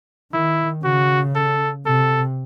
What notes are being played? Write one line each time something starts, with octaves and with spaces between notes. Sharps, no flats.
D#3 E4
C#3 F#4
A4
C3 A4